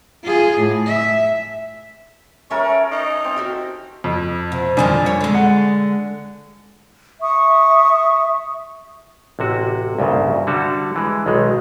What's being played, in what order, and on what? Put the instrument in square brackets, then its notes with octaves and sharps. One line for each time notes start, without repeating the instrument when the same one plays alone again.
[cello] F4 G#4
A2
E5
[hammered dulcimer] C#4 A4 A#4 [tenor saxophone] C#5 [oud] E5
[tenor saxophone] D#4
[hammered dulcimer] C4
[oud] E4 F#4 G4
[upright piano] F2
[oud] C3
[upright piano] F2 D4 G#5 [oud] D3 D#3 G3
[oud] C#5
D3 G#3
[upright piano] F#5
[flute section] E5 C#6 D#6
[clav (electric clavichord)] A1 C3 F#4
C2 G2 A#2 C#3
D3 G3 F#4 A4
E3 G#3
B1 D#3 G#3